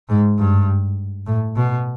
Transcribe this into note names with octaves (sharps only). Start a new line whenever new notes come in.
G#2
G2
A2
B2